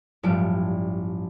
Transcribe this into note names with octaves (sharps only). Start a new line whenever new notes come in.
A1 G2 F3 G3 D7